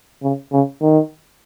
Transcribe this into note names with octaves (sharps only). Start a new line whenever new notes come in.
C#3
C#3
D#3